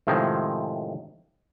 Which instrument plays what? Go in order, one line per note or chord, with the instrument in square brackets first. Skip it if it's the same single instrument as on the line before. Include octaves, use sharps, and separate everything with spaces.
[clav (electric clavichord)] A2 C3 D#3 F3 G#3